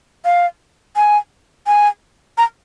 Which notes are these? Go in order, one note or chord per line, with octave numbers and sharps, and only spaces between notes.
F5
G#5
G#5
A#5